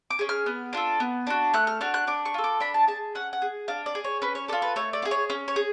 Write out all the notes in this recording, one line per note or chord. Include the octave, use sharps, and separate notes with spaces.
D6
C#4 G#4
F6
B3
D4 F4 A4
B3
D4 F#4
A3 F#6
F6
D4 F#4 F6
F#6
D4 D6
C#6
F4 A4
D6
D4 B5
A5
G#4 A5
C#4 F#5
F#5
G#4
D4 F5
D5
G#4
C#5
C#4 B4
C#5
F4 A4 D5
B4
A3 C#5
D5
F4
G#4
C#5
C#4
C#5
G#4